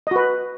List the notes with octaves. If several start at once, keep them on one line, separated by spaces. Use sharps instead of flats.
F#4 B4 D#5